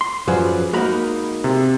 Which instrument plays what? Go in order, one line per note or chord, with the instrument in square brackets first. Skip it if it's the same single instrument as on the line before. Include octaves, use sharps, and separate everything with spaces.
[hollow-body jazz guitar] C6
[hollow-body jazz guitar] F#2 F3 F#3 [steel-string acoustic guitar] G#4 B4 D5
[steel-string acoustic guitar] G#3 A#3 D#4 [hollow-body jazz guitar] F#4 A#4 B5
[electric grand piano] C3